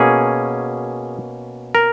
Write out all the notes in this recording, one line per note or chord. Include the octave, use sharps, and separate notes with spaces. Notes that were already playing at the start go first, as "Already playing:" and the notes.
Already playing: B2 A#3 C#4 G#4
A#4